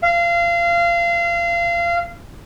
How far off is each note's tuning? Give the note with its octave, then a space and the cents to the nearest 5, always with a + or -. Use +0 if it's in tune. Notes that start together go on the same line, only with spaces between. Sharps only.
F5 -25